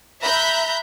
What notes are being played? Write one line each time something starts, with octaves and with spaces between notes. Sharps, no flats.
E5 A#5 B5 F#6 G6